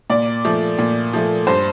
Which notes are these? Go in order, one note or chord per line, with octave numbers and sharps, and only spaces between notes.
A#2 D5
F3 A3
A#2
F3 A3
G2 C5